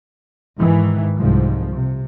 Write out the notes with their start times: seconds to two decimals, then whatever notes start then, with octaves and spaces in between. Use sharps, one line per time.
0.58 G#2 D#3 E3
1.16 C2 G#2 F3
1.73 C3